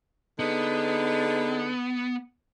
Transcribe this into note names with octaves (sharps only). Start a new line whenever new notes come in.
D3 B3 D#4 G#4